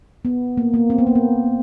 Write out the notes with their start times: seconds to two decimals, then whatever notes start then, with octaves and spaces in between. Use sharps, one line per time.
0.25 B3
0.57 A#3
0.74 A#3
0.90 C4
0.98 B3
1.07 A#3
1.15 B3